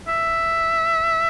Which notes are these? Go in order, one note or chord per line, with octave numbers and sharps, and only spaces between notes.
E5